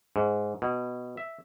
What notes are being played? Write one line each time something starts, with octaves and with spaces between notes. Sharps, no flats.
G#2
B2
E5